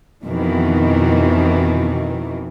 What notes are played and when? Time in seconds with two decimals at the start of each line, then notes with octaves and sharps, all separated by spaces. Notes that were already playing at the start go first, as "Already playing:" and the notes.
0.24 F2 B2 D#3 E3